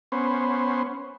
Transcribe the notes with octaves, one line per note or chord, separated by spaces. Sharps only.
B3 C#4 C5